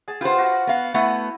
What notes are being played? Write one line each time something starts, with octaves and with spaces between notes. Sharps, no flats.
G#4 A5
F4 G4 B4 C5 F#5
F#4
B3 F5
A3 B3 E4 F#5